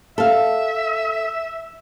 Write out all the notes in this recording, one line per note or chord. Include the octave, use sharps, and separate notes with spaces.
A4 E5 F5